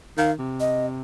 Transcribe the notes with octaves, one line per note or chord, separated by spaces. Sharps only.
D#3 F5
C3
D#5